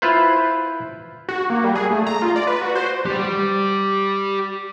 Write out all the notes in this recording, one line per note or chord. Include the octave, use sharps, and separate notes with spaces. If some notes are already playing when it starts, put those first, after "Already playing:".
E4 F4 B4 C5
F#4
A#3
G3
G#4
A3
A#5
F4
D5
B4
F#4
C5
G4 D5